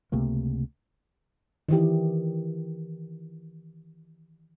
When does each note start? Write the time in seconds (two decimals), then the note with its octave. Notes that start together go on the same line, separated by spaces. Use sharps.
0.12 C#2 C3 A3 A#3
1.69 D#3 E3 G4